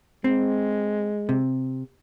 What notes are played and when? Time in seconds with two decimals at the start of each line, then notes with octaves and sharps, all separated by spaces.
0.24 G#3 C4
1.29 C3